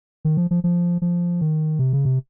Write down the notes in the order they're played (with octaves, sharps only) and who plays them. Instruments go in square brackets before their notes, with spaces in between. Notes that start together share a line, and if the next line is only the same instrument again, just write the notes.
[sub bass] D#3
F3
F3
F3
F3
D#3
C3
C#3
C3